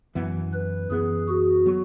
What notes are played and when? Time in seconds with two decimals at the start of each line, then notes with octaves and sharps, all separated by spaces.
0.15 F#2 E3 B3
0.53 B4
0.90 F#2 E3 B3 G#4
1.29 F#4
1.66 F#3 B3